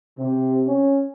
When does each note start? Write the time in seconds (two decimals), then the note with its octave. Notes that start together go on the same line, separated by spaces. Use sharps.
0.18 C3
0.66 C#4